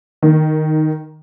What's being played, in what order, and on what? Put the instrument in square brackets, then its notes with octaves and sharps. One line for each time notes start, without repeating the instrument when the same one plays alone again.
[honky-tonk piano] D#3